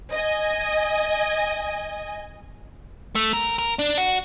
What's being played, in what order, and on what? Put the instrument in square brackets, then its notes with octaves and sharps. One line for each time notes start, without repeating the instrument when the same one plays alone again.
[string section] D#5 G#5
[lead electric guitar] A3
A#4
A#4
D4
F#4